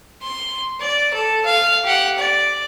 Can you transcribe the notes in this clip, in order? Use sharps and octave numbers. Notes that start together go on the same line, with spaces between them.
C6
D5
A4
F5
G4 F#5
D5